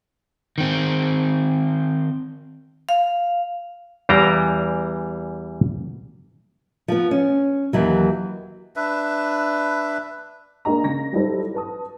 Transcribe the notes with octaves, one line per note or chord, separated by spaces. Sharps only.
D#3 C4
F5
E2 E3 G3 F5 G5 A#5
F3 B3
C#4
D#2 E3 F#3
D4 B4 E5
A#3 D4 G#4 D#5 A#5
C#3 A#6
F#3 G3 D#4 E4 A4 C5
B4 A5 D#6